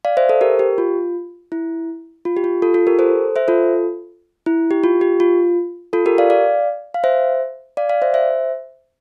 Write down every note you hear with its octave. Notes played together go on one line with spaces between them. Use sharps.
D5 F5
C5 E5
A4 C5
G4 A#4
G4
F4
E4
F4
G4
F4
F4 A4
F4 A4
G4 A#4
A4 C5
C5 E5
F4 A4
E4
G4
F4
G4
F4
F4 A4
G4 A#4
D5 F5
D5 F5
F5
C5 E5
D5 F5
D5 F5
C5 E5
C5 E5